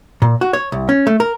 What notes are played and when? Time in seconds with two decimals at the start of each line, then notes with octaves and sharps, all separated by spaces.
0.22 A#2
0.41 F#4
0.53 C#5
0.72 C2
0.89 C#4
1.07 A3
1.20 A#4